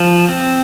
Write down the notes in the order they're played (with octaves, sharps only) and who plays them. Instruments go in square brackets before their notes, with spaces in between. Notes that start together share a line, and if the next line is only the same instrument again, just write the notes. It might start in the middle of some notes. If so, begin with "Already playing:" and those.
Already playing: [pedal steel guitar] F3
C4